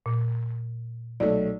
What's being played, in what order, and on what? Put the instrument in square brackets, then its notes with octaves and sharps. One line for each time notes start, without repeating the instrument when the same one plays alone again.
[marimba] A#2
[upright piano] B1 A3 [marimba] D5